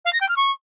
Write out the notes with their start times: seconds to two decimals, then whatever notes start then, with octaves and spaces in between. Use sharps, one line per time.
0.05 F5
0.13 A#6
0.21 G5
0.29 F6
0.36 C#6